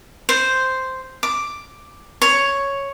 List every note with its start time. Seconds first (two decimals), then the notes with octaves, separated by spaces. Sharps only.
0.29 C5
1.23 D6
2.22 C#5